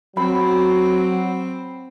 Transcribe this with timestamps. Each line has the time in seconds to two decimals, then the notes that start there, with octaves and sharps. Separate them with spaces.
0.17 F#3 C4 B5